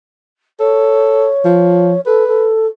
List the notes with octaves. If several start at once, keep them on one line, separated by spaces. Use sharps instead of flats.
A4 C#5
F3
A4 B4
A4